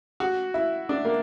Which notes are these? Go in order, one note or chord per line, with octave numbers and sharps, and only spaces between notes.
F#4
E4
D4
A#3